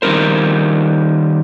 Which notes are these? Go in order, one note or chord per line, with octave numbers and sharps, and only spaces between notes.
D#3 G3 C#4 G#4 A#4 C5